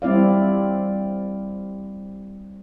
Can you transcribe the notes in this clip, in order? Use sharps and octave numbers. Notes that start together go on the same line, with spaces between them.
G3 C4 E4 D5 F5